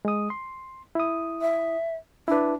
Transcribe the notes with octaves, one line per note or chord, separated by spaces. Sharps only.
G#3 D#6
C6
E4 D#6
E5
D4 E4 B4